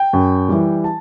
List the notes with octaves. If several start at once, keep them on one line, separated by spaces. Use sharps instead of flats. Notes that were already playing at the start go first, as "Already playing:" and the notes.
Already playing: G5
F#2
E3 G3
A5